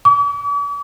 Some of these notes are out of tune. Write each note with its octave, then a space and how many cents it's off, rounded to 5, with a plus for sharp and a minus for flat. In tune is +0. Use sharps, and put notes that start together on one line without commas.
D6 -45